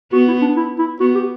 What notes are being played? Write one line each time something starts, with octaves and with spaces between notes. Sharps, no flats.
B3 F#4
E4
D4
E4
E4
B3 F#4
G4